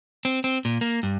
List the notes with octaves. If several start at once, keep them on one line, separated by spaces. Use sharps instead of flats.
C4
C4
A#2
A#3
G2